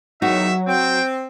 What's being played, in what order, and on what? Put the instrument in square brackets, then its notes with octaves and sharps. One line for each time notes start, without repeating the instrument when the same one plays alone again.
[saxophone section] E2 D#3 D#4 [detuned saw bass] F#3 [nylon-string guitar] F#4 [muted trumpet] E5
[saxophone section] C4 [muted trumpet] G5